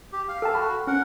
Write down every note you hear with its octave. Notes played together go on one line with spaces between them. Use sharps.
G4
F5
A4 G5 A5
F#4 B5
C#4 A#4 F#5